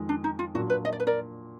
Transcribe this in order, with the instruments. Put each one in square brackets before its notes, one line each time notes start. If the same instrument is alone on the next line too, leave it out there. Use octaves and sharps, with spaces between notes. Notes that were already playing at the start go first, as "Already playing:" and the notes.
Already playing: [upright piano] F2 D#3 G#3
[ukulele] D4
D#4
F4
[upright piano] A#2 F#3 A#3 D4 [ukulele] F#4
[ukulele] B4
D#5
D5
B4
A#4 D5